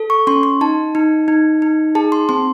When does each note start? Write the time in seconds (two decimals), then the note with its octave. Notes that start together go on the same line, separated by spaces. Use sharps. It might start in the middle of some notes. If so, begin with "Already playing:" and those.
Already playing: A4
0.10 C#6
0.27 C#4 C6
0.43 C6
0.61 D#4 A5
0.95 D#4
1.28 D#4
1.62 D#4
1.95 G#4 A5
2.12 C6
2.29 C4 C6